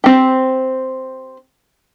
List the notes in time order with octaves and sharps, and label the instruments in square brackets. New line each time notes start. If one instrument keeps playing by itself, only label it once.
[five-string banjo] C4 G4